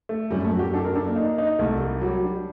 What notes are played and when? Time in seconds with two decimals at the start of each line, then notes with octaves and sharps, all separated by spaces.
0.09 A3
0.31 F#2 G3
0.45 A3
0.52 F#2 F#4
0.59 G4
0.73 D4 A4
0.84 A#4
0.94 D4 A4
1.05 A#3
1.16 D#4
1.38 D#4
1.59 C2 A3
1.80 G3
2.01 F#3 G3
2.23 D4